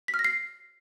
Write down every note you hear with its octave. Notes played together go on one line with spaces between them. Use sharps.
B6
F6
A#6
C7